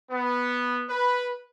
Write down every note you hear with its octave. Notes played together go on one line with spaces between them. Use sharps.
B3
B4